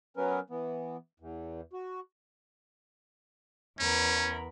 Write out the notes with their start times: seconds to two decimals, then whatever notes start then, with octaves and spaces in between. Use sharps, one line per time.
0.17 F#3 B3 C#4 A#4 B4
0.50 E3 B3
1.20 E2
1.73 F#4
3.79 E2 C#4 A#4 B5